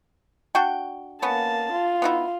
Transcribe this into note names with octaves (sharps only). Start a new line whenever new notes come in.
D4 F#4 G5
A#3 B3 C#4 A5
F4
B3 D#4 E4